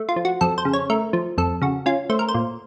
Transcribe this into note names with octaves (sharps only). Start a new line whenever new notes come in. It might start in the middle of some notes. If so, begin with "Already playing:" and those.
Already playing: A3
F4
F3
F#4
F2 A4
C5
C#3
C#5
A3 A#4
F3
F2 A4
C#3 F#4
C#4 F4
A3 C5
A#4
C5
A#2